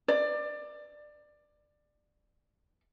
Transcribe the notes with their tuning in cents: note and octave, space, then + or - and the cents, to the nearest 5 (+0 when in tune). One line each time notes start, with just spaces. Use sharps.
D5 +20